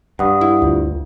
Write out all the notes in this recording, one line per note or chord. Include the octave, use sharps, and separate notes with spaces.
G2 F#5 D#6
E4
D2 F4